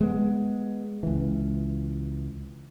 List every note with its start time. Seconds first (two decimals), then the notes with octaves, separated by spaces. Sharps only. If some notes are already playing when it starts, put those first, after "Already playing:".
0.01 G#3 B3
1.03 C#2 E3